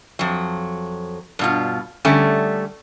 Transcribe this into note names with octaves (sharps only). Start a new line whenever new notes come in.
F2 F#3
G2 B2 F4
D3 G3 A3 C#4